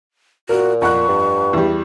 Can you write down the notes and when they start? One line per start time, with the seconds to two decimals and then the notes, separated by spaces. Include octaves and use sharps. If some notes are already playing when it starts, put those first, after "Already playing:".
0.49 A#2 F#4 A#4
0.82 F2 F#5 C#6 F#6
1.08 G2
1.53 E2 G3